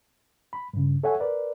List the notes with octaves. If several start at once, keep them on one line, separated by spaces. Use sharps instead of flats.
B5
G2 C#3
A4 C#5 E5 F#5 G#5
A#4 B4 D5